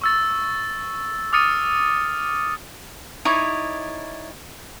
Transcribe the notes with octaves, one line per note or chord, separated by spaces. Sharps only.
C#6 E6 A6
D6 D#6 F6 A6 C#7 D#7
D#4 E4 C#5 D5